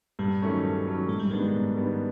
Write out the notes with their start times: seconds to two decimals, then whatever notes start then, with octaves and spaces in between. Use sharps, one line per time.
0.19 G2 G3
0.42 D#3 F#3 A3 C#4
0.64 G2
0.86 D#3 F#3 A3 C#4
1.08 G#2 G#3
1.19 G3
1.31 D#3 G3 G#3 B3 D4
1.53 G#2
1.75 D#3 G3 B3 D4